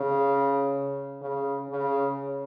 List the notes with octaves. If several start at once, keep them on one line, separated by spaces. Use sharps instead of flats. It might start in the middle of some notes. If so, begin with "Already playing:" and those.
Already playing: C#3
C#3
C#3